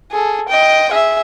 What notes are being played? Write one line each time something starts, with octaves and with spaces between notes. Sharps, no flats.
G#4 A4
D#5 G5
G#4 E5